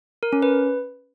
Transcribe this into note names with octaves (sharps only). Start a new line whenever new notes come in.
A#4
C#4
B4